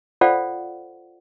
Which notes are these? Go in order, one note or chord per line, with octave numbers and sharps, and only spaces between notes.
F4 A4 C5 D5 F5 F#5